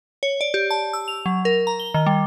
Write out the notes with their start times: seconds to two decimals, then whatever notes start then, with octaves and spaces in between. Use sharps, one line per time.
0.23 C#5
0.41 D5
0.54 G4
0.71 A5
0.93 E6
1.08 F7
1.26 F#3
1.45 A#4
1.67 A#5
1.80 G7
1.94 D#3
2.06 G3